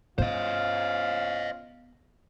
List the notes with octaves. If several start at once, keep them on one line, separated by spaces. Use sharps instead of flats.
B3 C#4 F4 C5 D#5 F5